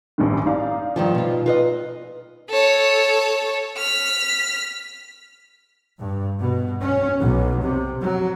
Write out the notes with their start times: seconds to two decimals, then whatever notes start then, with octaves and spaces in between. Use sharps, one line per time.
0.18 A1 G2 D#3
0.46 D#4 D5 F5
0.96 G2 D#3 F3
1.14 B2 F4
1.46 F4 B4 D#5
2.50 A4 C#5
3.77 F6 B6
6.00 G2
6.39 B2
6.82 C#4
7.19 B1
7.61 C3
8.00 F#3